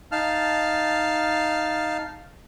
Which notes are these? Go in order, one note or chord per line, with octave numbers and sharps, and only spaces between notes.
D#4 F5 A5 F6